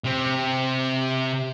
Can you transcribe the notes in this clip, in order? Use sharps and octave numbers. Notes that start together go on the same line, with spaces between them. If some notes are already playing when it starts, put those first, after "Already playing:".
C3 C4